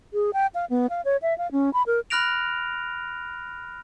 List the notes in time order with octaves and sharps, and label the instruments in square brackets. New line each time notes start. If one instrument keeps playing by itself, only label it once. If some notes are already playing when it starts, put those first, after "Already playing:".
[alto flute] G#4
G5
F5
B3
F5
C#5
E5
F5
C#4
B5
A#4
[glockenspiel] B5 F6 F#6 A#6 D7 F7